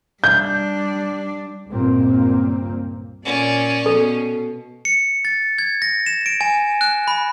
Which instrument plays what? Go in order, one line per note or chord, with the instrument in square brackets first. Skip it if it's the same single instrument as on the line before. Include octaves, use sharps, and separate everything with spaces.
[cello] G3 D4 [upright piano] G6
[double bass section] C#2 G2 A#2 A#3 C4
[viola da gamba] A#2 D5 [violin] C#4
[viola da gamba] B2 [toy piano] A4
[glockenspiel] C#7
A6
G#6
A#6
E7
D7
G#5
F#6
B5